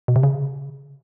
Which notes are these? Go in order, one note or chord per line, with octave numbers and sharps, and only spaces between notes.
B2
C3
C#3